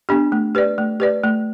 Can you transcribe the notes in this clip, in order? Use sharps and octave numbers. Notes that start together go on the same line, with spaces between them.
B3 D4 G4
A3
G4 B4 D5
A3
G4 B4 D5
A3